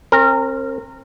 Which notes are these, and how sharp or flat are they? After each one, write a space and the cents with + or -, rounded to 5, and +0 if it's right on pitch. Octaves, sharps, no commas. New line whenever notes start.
C4 +40 A#4 -20